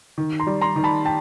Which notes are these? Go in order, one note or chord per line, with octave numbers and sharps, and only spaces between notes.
D#3
A#5 C6
G3
A#5 C6
D#3
A5 B5
G5 A5